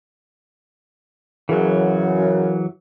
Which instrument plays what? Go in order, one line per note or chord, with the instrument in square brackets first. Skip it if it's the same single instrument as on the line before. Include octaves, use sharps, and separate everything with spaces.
[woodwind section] F#2 C#3 [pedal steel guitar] E3 F#3